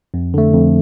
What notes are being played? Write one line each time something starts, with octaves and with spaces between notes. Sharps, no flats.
F2
D3 A3
F2